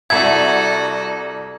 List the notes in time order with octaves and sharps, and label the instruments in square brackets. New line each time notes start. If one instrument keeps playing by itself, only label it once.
[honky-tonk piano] C2 E5 [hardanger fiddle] F#4 A4 [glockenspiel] G#6